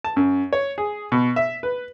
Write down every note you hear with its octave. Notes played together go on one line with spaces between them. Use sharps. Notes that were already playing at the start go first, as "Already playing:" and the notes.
A5
F#2
C#5
G#4
B2
E5
B4